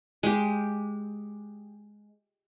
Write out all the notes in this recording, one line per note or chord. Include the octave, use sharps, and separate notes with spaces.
G#3 G4